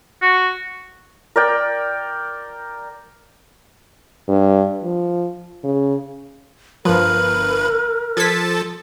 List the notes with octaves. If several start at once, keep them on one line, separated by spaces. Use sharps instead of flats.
F#4
A#4 D5 G5
G2
F3
C#3
G1 F3 A#4 B4
F3 A4 G#6 A6 B6